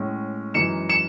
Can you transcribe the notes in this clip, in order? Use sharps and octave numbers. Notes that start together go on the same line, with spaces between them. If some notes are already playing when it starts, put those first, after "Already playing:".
Already playing: A2 G#3 C#4
F#2 E3 G#3 D#4 C#7 E7
C#7 E7